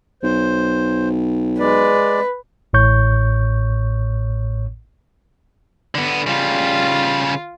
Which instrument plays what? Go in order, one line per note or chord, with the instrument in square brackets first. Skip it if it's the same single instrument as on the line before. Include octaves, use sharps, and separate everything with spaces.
[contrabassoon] B1 [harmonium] C5
[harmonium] G#3 D5 [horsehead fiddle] B4
[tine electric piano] A1 A2 C#5 C#6 G6
[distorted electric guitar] D3 B3
[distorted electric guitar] C#3 G3 [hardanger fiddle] F4